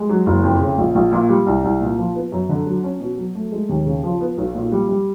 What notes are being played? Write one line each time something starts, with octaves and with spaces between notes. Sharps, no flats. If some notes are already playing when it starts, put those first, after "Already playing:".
Already playing: G#3
F#3
F#1
F2
C#3
A#1
A#1
A#2
G3
C2
C2
A#2
F3
B3
F#2
D3
F#3
C#4
B2
F#3
A3
G#3
D#2
C#3
F3
B3
B1
A#2
G3
G3